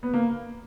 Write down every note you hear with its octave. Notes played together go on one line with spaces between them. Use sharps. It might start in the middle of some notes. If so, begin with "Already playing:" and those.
B3
A#3